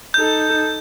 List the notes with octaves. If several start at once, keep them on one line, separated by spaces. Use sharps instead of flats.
D#4 A4 G6